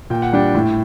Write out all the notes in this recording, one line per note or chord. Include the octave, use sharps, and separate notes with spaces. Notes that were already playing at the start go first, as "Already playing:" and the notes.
A#2 G5
F#5
G3 D4 G5
A2